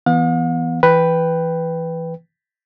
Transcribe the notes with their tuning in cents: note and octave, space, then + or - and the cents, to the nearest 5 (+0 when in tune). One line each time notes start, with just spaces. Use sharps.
E3 +0 B3 +0 F5 +45
E3 +10 B4 +0 G5 +0